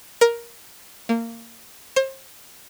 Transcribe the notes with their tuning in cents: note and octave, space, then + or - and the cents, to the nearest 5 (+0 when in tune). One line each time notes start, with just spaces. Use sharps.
A#4 +10
A#3 -20
C5 +35